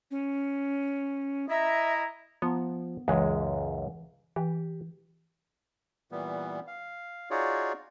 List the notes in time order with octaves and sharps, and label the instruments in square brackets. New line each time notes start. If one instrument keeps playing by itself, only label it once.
[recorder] C#4
[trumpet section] E4 D#5 A#5 [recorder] E5
[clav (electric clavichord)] F3 A#5 [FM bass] B3
[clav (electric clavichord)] C#2 F#2 G#3 [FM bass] E3
[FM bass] E3 [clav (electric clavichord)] G4
[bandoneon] A#2 E3 G3 B3
F5
D#4 F4 F#4 G#4 C#5 D5